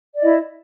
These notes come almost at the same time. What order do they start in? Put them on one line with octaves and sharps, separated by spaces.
D5 D#5 E4